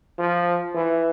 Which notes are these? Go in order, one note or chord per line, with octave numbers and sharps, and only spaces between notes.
F3
E3